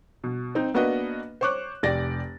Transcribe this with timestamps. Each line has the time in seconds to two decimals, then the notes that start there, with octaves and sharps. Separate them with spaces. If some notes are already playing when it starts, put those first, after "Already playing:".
0.24 B2
0.55 C4 D#4
0.74 A#3 B3 D4 F#4 B4 D#5
1.41 C5 C#5 C#6 D6 F#6
1.83 F1 G4 D5 A6 A#6